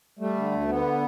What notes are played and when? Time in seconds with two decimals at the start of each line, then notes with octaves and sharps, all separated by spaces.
0.19 G3 A3
0.35 D3
0.51 D2
0.68 D3 B3